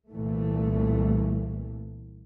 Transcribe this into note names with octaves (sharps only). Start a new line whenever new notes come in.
C2 A#2 E3 A3